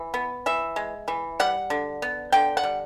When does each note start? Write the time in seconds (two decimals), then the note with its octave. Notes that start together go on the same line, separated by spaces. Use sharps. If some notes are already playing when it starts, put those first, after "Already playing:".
Already playing: E3
0.14 B3
0.46 E3 E5
0.76 G#3
1.08 E3
1.40 G3 F#5
1.70 D3
2.02 B3
2.32 D3 G5
2.57 F#5
2.63 G3